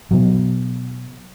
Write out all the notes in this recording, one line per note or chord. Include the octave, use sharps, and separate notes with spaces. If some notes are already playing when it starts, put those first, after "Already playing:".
B2 F#3